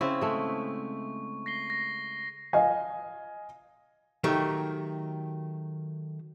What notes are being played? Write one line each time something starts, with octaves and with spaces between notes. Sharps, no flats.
C#3 C4 E4 C#6
G#3 A3
A#6 C7 G7
A#6
D#5 F5 G#5
D#3 F#3 A3 G4